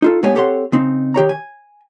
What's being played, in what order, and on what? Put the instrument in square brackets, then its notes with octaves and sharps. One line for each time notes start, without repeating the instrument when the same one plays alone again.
[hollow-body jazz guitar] D#4 F4 A4
A2 G#3 B3 G4 C#5 G#5
C4 G4 A4 C#5 F#5 C6
C#3 C4 D#4
D#3 G4 C#5 A#5
G#5